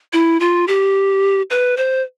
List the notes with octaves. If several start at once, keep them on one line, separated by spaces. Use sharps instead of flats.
E4
F4
G4
B4
C5